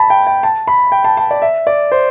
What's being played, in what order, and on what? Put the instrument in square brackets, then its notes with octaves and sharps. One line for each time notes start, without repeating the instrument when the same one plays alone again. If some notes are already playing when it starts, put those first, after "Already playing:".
Already playing: [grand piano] A5 B5
G5
G5
A5
B5
G5
A5
A5
D5
E5
D5
C5